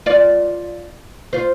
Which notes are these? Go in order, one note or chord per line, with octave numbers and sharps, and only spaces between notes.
F4 D5
F4 C5